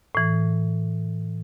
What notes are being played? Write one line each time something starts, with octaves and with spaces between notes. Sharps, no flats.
A2 E3